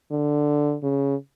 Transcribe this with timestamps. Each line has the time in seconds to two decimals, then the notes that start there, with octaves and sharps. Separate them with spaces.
0.11 D3
0.83 C#3